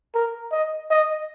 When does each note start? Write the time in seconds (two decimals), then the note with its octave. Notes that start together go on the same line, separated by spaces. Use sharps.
0.15 A#4
0.52 D#5
0.91 D#5